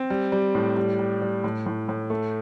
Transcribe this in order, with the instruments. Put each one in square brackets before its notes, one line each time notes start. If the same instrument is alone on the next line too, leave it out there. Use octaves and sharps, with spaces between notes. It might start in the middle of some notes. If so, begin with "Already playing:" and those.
Already playing: [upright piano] C4
G3
G3
A2
G3
G3
G3
A2
A2
A2
A3